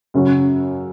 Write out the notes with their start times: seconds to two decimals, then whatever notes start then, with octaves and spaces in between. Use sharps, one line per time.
0.14 F#2 C#3 F#3 C#4 F#4